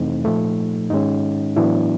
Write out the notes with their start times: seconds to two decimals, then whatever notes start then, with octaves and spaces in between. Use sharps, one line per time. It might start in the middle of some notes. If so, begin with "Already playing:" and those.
Already playing: F2 C3 E3 A3 C4 D#4
0.25 A#2 F3 A3
0.90 G#2 D#3 G#3 C#4 D#4
1.56 A2 E3 F#3 B3 D4 E4